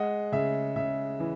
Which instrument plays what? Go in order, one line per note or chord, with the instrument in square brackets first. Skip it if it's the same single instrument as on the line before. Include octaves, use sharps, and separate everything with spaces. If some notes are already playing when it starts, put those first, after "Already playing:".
Already playing: [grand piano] G#3 D#5 F#5
C#3 E5
C#3 E5
E3